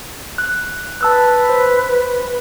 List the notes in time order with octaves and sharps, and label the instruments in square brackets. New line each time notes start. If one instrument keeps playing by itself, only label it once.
[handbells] F#6
[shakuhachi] B4 [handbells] A5 E6 F#6
[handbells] C5